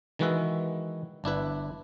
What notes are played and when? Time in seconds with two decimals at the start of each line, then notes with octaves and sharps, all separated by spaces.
0.19 D#3 E3 G#3 F#4 B4 E5
1.24 G1 D4 E4 B4